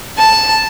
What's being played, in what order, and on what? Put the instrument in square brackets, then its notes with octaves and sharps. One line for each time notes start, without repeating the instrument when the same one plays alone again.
[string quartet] A5